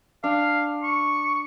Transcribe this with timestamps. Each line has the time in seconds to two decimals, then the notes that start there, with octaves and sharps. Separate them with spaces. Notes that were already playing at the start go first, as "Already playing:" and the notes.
0.24 D4 F5
0.83 C#6